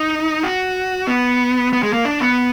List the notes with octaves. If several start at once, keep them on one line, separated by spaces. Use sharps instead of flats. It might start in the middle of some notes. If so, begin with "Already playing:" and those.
Already playing: D#4
F#4
B3
B3
G#3
A#3
D4
B3